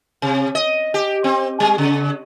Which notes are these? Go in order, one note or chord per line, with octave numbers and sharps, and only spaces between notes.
C3
D#5
G4
C4
G3
C#3